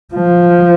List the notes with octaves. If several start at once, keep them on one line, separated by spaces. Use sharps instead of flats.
F3